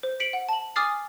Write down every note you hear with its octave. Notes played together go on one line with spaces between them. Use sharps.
C5
B6 C#7 D7 F#7
F#5
A5 F#7
G#5 D6 D#6 F6 A6 C7